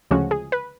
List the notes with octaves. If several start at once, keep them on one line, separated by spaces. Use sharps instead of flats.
D2 C#3 F3 G#3 C#4 F#4
G#4
B4